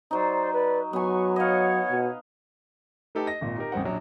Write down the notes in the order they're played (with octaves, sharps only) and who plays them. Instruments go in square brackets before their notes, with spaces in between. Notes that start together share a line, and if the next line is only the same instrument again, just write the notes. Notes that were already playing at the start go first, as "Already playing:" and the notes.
[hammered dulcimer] F#3 D#4 [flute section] C5 D5
[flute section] B4 D5
[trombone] F#3 [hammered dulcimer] B3 G#5 [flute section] C#6
[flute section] C#5 F#5 [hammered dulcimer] D#5 F5
[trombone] B2
[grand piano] A3 D#4 G4 A4 B4
D#5 A#6
G#1 A#2
D#4 G4 A#4
A1 G3 C4 F#5
A#1 F#3 D4